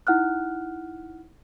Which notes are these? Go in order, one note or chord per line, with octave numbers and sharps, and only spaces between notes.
D#4 E4 F#5 F6 F#6